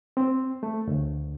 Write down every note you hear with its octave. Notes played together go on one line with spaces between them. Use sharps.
C4
A3
D2